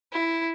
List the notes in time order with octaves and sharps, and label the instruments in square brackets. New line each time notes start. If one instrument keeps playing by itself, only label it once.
[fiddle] E4